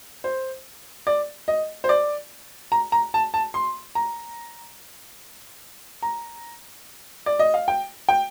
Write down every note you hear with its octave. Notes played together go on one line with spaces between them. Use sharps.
C5
D5
D#5
C5
D5
A#5
A#5
A5
A5
C6
A#5
A#5
D5
D#5
F5
G5
G5